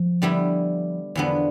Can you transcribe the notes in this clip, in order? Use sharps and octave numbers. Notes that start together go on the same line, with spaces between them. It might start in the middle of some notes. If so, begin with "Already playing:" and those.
Already playing: F3
D3 G3 B3 E4
E2 D3 F3 B3